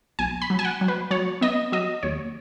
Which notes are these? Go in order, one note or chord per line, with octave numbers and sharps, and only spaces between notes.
B1 G#5
B5
F#3
G#5
F#5
F#3
B4
F#3 C#5
B3 D#5
F#3 D#5
D#2 C#5